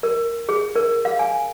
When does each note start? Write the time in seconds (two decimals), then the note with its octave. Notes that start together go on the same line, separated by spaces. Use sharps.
0.03 A#4
0.49 G#4
0.75 A#4
1.05 F5
1.19 G#5